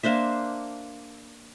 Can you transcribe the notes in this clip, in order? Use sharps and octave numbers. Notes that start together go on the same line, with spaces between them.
A#3 D4 C5 E5